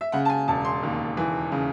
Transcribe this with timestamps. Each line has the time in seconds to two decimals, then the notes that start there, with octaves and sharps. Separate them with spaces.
0.01 E5
0.12 C#3 F#5
0.25 A5
0.30 G#5
0.48 E1 A5
0.65 C6
0.83 D#2
1.17 E3
1.52 C#3